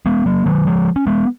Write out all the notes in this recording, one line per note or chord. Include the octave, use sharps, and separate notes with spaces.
G#3 B3
F#3 A#3
D#3 F#3
F3 G#3
C#4
G#3 B3